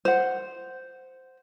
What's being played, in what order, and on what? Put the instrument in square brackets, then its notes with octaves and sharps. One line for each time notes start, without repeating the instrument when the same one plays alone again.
[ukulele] C5 F#5